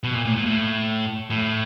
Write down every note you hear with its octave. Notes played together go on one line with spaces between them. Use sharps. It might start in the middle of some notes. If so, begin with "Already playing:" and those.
B2
A#2
A2
A#2
A2
A2